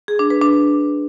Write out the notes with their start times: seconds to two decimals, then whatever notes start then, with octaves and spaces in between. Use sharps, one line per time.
0.08 G#4
0.19 D4
0.30 B4
0.42 D4